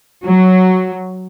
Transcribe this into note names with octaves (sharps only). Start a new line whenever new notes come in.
F#3